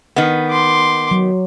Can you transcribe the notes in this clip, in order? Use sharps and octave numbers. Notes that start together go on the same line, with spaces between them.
D#3 B3
C6 D6
F#3